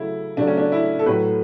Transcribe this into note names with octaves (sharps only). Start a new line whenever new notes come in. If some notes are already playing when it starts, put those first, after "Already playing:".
Already playing: C#3 F#3 A3 E4
C#3 F#3 A3 D4
C#4
D4
E4
A4
A2 F#3 A3 B4